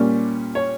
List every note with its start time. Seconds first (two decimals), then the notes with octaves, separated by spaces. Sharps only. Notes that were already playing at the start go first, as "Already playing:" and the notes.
Already playing: A#2 G3 A#3 C#4 D5
0.55 C#5